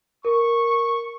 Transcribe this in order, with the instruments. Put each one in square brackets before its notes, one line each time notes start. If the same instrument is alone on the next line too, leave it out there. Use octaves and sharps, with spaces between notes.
[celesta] A#4 [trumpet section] C#6